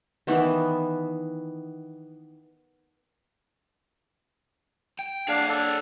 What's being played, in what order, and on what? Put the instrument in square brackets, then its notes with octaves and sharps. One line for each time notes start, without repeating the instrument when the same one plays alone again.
[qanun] D#3 E3 B3 E4
[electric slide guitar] G5
[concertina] D4 F5 [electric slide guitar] G#4 C#5 F#5
[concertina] D4 A4